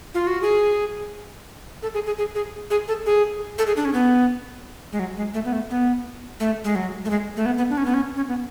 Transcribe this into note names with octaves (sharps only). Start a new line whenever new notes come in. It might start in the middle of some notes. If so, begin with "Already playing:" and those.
F4
F#4
G#4
A4
G#4
G#4
G#4
G#4
G#4
A4
G#4
A4
G#4
D4
C#4
B3
G#3
F#3
G#3
A3
B3
A3
B3
A3
G#3
F#3
A3
G#3
A3
B3
B3
D4
C#4
B3
C#4
C#4
B3